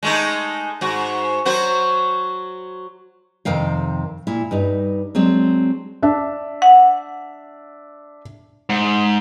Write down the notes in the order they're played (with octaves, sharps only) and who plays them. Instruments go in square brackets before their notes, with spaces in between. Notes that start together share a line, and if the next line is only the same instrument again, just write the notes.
[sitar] G#3 A3 D#4
G#2 F#4
F#3 F#4 C5
[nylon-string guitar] F2 C3 D#3 F5 G5
A#2 E4
G2 G3 D#4
F#3 G#3 C4 D4
[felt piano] D4 E5
[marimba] F#5
[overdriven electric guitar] G#2